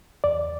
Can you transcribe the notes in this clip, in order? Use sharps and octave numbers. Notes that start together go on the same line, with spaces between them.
E2 D5